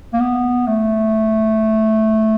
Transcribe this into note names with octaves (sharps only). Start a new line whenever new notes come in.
A#3
B3
A3